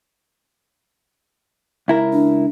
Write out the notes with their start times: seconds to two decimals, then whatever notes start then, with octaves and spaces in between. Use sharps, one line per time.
1.88 C#2 E4 A#4
2.13 D4